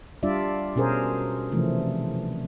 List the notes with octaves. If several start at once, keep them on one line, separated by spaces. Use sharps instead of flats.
G3 D4 F4 D5 E5
B2 C#4 G#4 A#4 C5
C3 E3 F3 A3